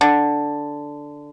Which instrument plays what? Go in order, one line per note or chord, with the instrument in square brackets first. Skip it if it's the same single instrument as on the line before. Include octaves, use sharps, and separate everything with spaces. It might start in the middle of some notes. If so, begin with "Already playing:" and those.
[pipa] D3